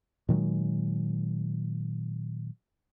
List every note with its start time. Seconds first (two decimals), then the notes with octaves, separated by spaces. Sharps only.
0.29 A#2 D#3 F#3 G#3